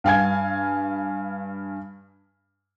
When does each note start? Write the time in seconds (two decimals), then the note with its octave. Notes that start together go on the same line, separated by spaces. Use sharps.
0.04 G2 F5 G#5 G#6